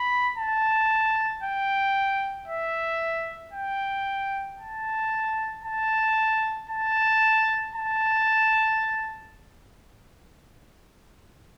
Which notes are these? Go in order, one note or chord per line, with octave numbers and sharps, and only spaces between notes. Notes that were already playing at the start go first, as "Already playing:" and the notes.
Already playing: B5
A5
G5
E5
G5
A5
A5
A5
A5